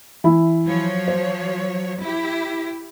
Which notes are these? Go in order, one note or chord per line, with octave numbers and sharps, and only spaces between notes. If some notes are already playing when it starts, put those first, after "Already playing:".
E3 E4
F3 F#3 C#5
C5
E4 G4